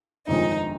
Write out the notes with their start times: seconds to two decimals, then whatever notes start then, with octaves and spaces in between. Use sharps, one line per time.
0.28 G1 F2 D#3 G#3 D#4